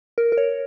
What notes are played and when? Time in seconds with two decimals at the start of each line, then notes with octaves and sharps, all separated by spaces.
0.18 A#4
0.32 A#4
0.38 C#5